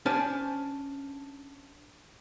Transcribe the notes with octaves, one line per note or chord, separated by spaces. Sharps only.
C#4 D4 C5 G#5 A5